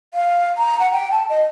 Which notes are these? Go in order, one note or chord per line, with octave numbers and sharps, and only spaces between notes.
F5
A#5
F#5
G5
A5
D#5